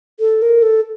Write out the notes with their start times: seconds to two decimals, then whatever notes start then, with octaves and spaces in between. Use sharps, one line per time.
0.20 A4
0.42 A#4
0.63 A4